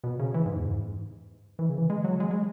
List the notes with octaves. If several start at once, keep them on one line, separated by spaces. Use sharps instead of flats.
B2
C#3
E3
G#2
E2
G#2
E3
C#3
E3
G#3
F#3
G#3
G#3